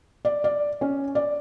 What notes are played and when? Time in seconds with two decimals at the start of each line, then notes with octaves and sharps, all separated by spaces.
0.25 D5
0.44 D5
0.81 C#4
1.15 D5